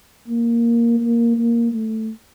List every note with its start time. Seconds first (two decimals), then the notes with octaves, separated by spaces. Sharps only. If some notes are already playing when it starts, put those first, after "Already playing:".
0.27 A#3
1.00 A#3
1.37 A#3
1.72 A3